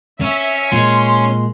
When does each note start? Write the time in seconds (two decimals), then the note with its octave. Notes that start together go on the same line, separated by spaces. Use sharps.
0.22 C#4 E5
0.73 A#2 G#3 C6